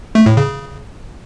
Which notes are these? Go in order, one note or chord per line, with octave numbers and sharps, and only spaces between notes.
A3
A2
C#3